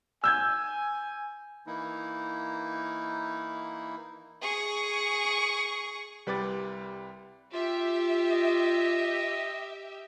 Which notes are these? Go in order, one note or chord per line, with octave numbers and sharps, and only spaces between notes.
G#5 E6 G6 G#6
E3 A#3 D#4 E4
G#4 C#6
C2 G3 B4 G5 D6 A6
F4 G4 E5
D#5